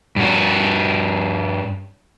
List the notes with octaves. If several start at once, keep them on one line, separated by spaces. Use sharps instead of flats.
G2 F#4